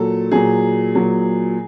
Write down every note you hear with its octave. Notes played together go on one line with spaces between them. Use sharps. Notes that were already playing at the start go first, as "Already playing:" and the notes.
Already playing: A#2 F#3 A4
A#2 F#3 G#4
A#2 F#3